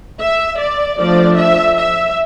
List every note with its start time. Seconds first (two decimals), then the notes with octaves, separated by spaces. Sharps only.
0.21 E5
0.59 D5
0.99 F3 A3 D4 D5
1.38 E5
1.77 E5